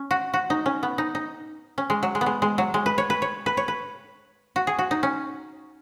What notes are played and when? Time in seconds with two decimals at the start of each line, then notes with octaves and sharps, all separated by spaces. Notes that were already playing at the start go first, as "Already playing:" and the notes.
Already playing: C#4
0.11 F#4
0.34 F#4
0.50 D#4
0.66 C#4
0.83 B3
0.98 D#4
1.15 D#4
1.78 C#4
1.90 G#3
2.03 F#3
2.15 G#3
2.21 B3
2.26 G#3
2.42 G#3
2.58 F#3
2.74 G#3
2.86 B4
2.98 C#5
3.10 B4
3.22 C#5
3.46 B4
3.57 C#5
3.68 B4
4.56 F#4
4.67 G#4
4.79 F#4
4.91 D#4
5.03 C#4